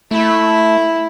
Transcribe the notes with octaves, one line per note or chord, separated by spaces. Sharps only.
A3 E4